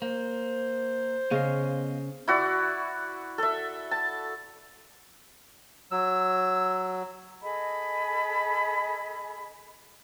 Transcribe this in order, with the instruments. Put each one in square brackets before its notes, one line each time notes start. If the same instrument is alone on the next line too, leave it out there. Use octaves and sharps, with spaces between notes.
[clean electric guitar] A#3 [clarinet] C5
[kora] C#3 [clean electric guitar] B3 D#5 F5
[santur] E4 F#4 D5
A4 E5
A5
[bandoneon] F#3 [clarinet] E6
[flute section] G#4 A4 D#5 B5